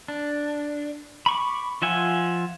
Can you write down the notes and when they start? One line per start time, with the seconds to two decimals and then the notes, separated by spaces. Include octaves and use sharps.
0.08 D4
1.26 B5 C#6 D6
1.82 F3 F4 E5 F#5 G#5